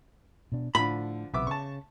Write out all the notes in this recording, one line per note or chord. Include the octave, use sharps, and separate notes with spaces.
B2 D4
A2 D3 F3 B5
B1 C3 E3 B3 E5 D6
C#3 A5 C#6